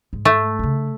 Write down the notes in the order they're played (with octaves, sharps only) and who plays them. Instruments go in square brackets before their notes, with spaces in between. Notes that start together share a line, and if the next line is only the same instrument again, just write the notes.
[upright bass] G#2
[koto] A3
[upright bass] C#3 D4